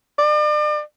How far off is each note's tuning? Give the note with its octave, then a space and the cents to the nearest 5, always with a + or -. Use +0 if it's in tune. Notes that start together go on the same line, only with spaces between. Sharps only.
D5 +40